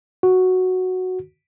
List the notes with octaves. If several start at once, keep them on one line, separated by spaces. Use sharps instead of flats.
F#4